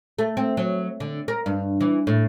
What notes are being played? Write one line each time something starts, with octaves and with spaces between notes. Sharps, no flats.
A3
C4
F#3
D3
A#4
G2
E3
A2